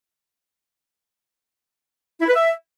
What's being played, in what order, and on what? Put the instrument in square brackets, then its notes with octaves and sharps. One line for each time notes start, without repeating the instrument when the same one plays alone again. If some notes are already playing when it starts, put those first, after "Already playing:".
[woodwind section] E4
B4
E5